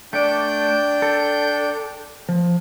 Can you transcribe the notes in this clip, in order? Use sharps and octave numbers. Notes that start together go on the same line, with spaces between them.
A3 D4 D5 G5 G6
A4
F3